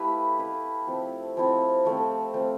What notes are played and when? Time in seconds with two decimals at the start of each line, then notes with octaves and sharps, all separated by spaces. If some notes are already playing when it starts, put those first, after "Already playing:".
Already playing: A3 E4 G4 B4 F5
0.38 E4 B4 F5
0.87 F3 C4 E4
1.37 F3 C4 E4
1.85 F3 A3 C4
2.34 F3 A3 C4